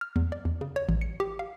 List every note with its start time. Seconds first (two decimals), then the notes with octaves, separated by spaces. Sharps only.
0.01 F6
0.16 E2
0.32 D5
0.45 E2
0.61 C#3
0.76 C#5
0.89 A1
1.01 C#7
1.20 G4
1.39 F5